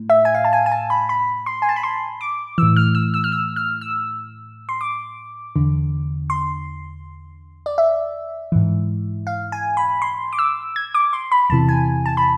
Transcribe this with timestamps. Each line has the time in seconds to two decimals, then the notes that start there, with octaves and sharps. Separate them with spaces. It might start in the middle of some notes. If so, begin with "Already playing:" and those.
Already playing: A2
0.10 E5
0.25 G#5
0.35 F5
0.45 A5
0.53 G#5
0.66 G#5
0.72 A5
0.90 B5
1.09 B5
1.46 C6
1.62 G#5
1.69 A5
1.76 B5
1.83 C6
2.21 D6
2.58 A2 E3 E6
2.76 F6
2.95 E6
3.14 E6
3.24 F6
3.32 E6
3.56 F6
3.81 E6
4.69 C6
4.81 D6
5.56 E2 D3
6.30 C6
7.66 D5
7.78 E5
8.52 G#2 E3
9.27 F5
9.52 G#5
9.77 B5
10.02 C6
10.33 D6
10.39 E6
10.76 G#6
10.95 D6
11.13 C6
11.32 B5
11.50 E2 C3 E3 A5
11.69 G#5
12.06 A5
12.17 B5